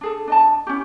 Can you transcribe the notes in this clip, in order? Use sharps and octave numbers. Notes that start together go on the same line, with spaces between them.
D4 G#4 A4
D4 D#5 A5
C#4 E4 G4